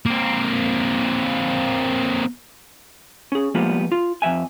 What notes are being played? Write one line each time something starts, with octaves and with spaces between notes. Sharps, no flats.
A#3 C4
C#4 G#4
F3 G3 G#3 A#3 B3 F4
F4
F2 G#2 E5 G#5